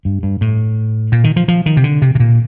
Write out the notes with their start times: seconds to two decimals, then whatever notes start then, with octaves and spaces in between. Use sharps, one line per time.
0.05 G2
0.23 G2
0.41 A2
1.12 A#2
1.24 D#3
1.36 F3
1.48 F3
1.66 D#3
1.77 C3
1.84 D3
2.02 C3
2.15 C3
2.20 A#2